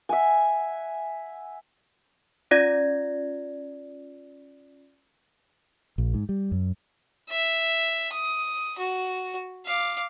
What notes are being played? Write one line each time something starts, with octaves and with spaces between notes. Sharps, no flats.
E5 F#5 G#5
C#4 F4 D5 G#6 A#6
A#1
G#2
G3
F#2
E5
D#6
F#4
F5 D6